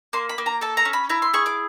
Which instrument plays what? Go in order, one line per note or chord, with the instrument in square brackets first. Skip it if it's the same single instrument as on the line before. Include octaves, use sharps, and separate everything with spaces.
[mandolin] A#3 C6
B5
A#3
A#5
A4 A5
A#5
C#4
B5
E4 A#5
C6
G#4 C#6
D6